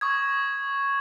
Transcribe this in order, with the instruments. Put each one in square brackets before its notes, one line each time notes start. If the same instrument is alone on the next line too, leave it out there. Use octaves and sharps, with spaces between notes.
[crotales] C#6 D#6 G#6